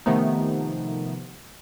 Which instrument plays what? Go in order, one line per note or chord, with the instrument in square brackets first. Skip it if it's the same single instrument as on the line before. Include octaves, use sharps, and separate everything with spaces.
[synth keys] C3 D#3 F3 A3 B3 D#4